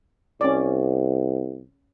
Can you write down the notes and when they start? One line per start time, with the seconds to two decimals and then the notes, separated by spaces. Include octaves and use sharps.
0.41 C2 C#4 D5